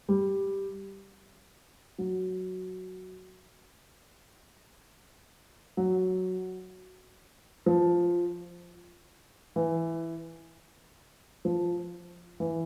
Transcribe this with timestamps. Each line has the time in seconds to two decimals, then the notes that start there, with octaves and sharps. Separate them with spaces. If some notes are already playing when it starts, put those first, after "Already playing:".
0.09 G3
1.98 F#3
5.77 F#3
7.66 F3
9.56 E3
11.45 F3
12.40 E3